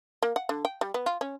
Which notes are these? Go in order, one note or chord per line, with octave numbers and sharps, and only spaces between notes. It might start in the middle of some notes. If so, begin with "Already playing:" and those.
A#3
F#5
D3
G5
G3
B3
F4
C#4